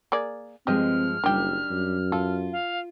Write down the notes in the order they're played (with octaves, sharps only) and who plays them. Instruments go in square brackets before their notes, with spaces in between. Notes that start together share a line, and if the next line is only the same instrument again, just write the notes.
[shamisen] A#3 G#4 D5
[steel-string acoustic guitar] G2 F3 G#3 [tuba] C4 [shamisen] G4 D#5 [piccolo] F6
[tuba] F#1 [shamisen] D#3 G4 [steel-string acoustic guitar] G3 D4
[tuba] F#2
[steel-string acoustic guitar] F4 [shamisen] A4
[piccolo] F5